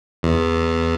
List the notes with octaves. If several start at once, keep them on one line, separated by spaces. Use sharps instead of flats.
E2